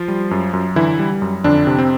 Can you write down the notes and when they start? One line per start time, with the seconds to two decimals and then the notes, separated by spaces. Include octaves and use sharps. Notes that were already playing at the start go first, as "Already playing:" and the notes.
Already playing: F3 F4
0.08 G3
0.31 F#2
0.53 F#2
0.76 D3 E3 E4
0.99 G3
1.22 F#2
1.44 F2 D3 D4
1.67 C3
1.79 C4